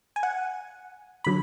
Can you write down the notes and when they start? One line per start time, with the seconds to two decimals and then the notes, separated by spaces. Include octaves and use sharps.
0.16 G#5
0.23 F#5
1.24 D3 F#3 B5